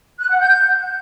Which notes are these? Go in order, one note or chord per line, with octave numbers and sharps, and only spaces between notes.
F#6
F#5
G6